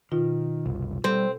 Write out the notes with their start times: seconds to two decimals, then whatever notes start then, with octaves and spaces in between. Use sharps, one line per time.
0.12 B2 D#3 F4
0.66 F#1 C2
1.04 G3 C4 A4